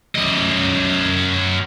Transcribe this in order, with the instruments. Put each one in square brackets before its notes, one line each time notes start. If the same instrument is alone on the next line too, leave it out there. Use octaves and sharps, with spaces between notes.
[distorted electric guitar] F#2 D#5